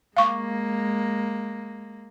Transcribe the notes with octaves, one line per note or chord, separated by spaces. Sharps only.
G#3 A#3 F5 C#6 D6